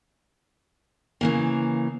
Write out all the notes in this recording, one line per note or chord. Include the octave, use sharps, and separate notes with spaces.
C#3 E3 A#3